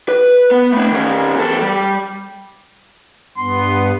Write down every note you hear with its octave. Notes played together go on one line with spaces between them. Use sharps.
B4
B3
A3 C4
D#3 C#4
E2 A4
G3
G2 B3 C6